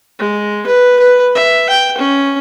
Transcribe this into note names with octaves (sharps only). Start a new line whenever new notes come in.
G#3
B4
B4
E5
G5
C#4